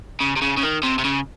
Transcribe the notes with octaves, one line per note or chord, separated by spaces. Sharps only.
C#3
C3
C#3
C#3
D#3
C3
C3
C#3